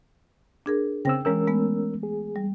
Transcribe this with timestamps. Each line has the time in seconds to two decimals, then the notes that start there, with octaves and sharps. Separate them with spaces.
0.66 D4 G#4 A#4
1.05 C#3 C4 G5 E6 A#6
1.25 E3 G#3 C#4 A#4 E6
1.47 G#3 A3 B3
2.03 G#4
2.36 G3